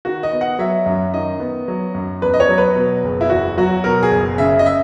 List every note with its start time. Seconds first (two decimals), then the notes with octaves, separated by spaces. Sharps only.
0.05 D#3 F#4
0.23 D#5
0.32 B3
0.41 F#5
0.59 F#3 E5
0.86 F#2
1.14 D#3 D#5
1.40 B3
1.68 F#3
1.95 F#2
2.21 E2 B4
2.34 D#5
2.40 C#5
2.49 F#3
2.58 B4
2.76 B2
3.04 F#1
3.21 E4
3.30 E2 F#4
3.57 F#3 F#4
3.84 B2 A#4
4.03 G#4
4.11 F#1
4.38 C#3 E5
4.59 D#5
4.66 E5